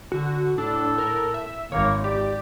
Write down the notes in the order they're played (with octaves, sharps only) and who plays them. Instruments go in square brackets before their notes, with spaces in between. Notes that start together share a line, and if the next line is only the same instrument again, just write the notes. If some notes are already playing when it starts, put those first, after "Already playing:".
[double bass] D3 [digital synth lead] F#4
[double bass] A2 [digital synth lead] D4 [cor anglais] A4
[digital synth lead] A#4
E5
[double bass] G#1 [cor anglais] A#3 [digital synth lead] C#5
[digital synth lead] G4 [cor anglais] D5